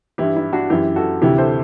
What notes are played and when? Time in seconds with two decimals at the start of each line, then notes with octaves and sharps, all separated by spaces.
0.18 G2 E3 E4 G4
0.36 E4
0.53 D4 F#4
0.70 F#2 E3 E4 G4
0.96 F#4 A4
1.22 D2 C3 E3 E4 G4
1.38 A4 C5